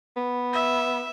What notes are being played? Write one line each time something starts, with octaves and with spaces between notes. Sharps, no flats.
B3
E5